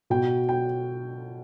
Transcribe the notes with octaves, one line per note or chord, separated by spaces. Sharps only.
B2 G5
G5